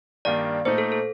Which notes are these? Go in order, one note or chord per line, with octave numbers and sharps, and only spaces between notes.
G2 D#3 A#3 D4 D5
A#2 A3 D#4 C5
A4
A4